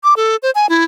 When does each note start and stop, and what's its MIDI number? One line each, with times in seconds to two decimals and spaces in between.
0.04 0.14 86
0.17 0.36 69
0.43 0.51 72
0.55 0.69 80
0.69 0.84 64